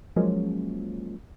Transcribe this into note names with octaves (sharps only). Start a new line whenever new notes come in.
F3 F#3 G#3 A#3 C#4